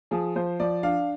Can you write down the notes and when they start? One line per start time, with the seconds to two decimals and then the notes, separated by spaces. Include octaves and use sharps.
0.11 F3 G#4
0.36 F3 C5
0.60 F3 D5
0.83 D4 F5